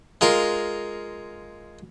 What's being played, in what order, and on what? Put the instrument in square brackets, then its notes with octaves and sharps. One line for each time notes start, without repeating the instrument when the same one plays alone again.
[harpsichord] G#3 F4 A#4